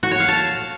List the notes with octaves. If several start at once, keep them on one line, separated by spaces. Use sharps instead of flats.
F#4
C#5
F5
A5